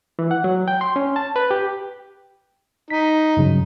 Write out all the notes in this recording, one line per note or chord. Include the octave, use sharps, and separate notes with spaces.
E3
F#5
F#3
G5
C6
C#4
A5
B4
G4
D#4 B6
G2 C#3 F#3